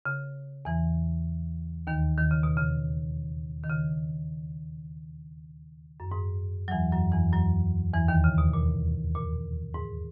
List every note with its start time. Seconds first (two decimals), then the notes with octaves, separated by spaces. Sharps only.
0.06 C#3
0.65 E2 E3
1.87 D#2 D#3
2.18 D#3
2.31 C#3
2.43 B2
2.57 C#3
3.64 D#3
3.69 C#3
6.00 F#2
6.12 G#2
6.68 F#3
6.71 E2 E3
6.92 F#2 F#3
7.12 E2 E3
7.33 F#2 F#3
7.94 E2 E3
8.08 D#2 D#3
8.24 C#3
8.38 B2
8.53 A#2
9.15 A#2
9.74 G#2